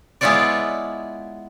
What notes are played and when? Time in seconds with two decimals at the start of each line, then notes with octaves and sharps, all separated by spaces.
0.21 G#3 B3 E4 F4 C#5 D5